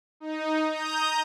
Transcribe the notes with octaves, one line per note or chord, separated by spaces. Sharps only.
D#4
A#5 D#6 G6